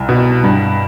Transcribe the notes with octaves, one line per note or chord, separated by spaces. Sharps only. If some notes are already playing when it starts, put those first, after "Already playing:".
Already playing: C2
B2
G2